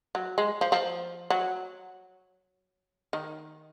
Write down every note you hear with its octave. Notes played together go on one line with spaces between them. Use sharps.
F#3
G#3
F3
F3
F#3
D#3